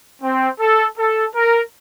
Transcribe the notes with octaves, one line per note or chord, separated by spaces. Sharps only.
C4
A4
A4
A#4